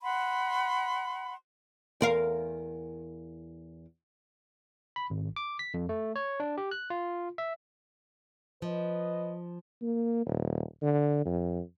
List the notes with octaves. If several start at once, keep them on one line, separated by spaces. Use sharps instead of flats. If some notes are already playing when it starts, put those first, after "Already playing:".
F#5 B5 C6
E2 A#4 F5
B5
G#1
D6
B6
F2
A3
C#5
D4
G4
F#6
F4
E5
F3 B4 D#5
A#3
D#1
D3
F2